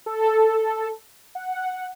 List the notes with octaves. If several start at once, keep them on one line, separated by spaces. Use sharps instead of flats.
A4
F#5